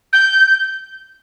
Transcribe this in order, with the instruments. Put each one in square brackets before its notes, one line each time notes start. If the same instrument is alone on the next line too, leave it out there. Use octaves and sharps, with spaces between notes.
[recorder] G6